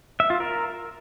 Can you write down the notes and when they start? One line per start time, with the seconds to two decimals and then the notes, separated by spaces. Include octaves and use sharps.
0.20 E5
0.30 F4
0.40 A#4